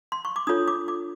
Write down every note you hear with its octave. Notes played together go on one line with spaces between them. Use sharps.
C6
C#6
D6
D4 F4 A4 C#5 D#6
D6
D6